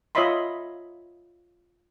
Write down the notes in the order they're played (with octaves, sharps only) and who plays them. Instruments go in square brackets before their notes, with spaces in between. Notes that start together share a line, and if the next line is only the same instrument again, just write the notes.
[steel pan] F4 C#5 D#5 E5 B5 C6